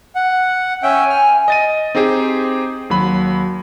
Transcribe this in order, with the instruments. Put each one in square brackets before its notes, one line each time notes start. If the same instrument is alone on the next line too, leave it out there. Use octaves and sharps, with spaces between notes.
[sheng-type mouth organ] F#5
[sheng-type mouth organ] C#4 E5 G5 [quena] G#5
[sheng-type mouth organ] F6
[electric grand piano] D#5 A6 D#7
C4 D#4 G4 G#4 C5
D#2 F#3 B5